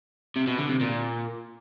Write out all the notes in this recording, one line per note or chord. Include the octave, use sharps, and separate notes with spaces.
C3
B2
D3
C3
A#2